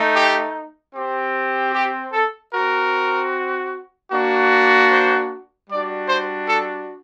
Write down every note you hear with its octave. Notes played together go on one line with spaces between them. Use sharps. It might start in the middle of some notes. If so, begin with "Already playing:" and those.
Already playing: A3 D#4
G4
C4 G4
G4
A4
C4 F#4 A#4
A#3 D4 F#4
C5
G3 D4 F#4 D5
C5
A4